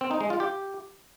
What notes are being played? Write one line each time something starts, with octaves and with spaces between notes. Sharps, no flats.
C4
D#4
G#3
F4
G4